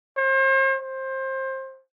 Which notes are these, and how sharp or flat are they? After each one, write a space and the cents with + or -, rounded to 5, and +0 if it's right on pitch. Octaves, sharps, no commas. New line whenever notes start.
C5 +40
C5 +25